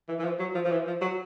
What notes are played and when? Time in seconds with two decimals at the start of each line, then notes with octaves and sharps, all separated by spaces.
0.09 E3
0.19 E3
0.24 F3
0.40 F#3
0.55 F3
0.65 F3
0.72 E3
0.87 F3
1.02 F#3